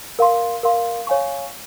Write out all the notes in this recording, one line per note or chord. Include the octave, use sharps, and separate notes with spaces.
A#4 F5 C6
A#4 F5 C6
C#5 F5 G#5 C#6